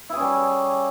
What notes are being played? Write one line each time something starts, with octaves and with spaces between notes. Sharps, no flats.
G3 C#4 E4 G#4